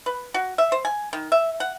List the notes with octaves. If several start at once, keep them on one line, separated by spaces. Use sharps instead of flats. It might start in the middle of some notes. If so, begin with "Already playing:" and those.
B4
F#4
E5
C5
G#5
D#3
E5
F#5